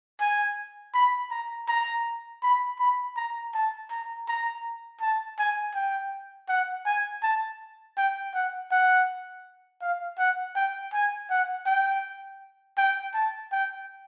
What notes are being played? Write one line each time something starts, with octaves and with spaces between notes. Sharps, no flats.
G#5
B5
A#5
A#5
B5
B5
A#5
A5
A#5
A#5
A5
G#5
G5
F#5
G#5
A5
G5
F#5
F#5
F5
F#5
G5
G#5
F#5
G5
G5
A5
G5